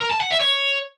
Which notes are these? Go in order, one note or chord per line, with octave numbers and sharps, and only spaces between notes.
A#4
A5
F#5
E5
C#5